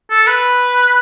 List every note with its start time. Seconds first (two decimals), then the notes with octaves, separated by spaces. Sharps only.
0.10 A4
0.27 B4